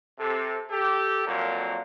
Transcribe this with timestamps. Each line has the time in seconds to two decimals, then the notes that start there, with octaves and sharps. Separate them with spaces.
0.19 C3 A4
0.71 G4 A4
1.26 F2 A#2 F#3 A#3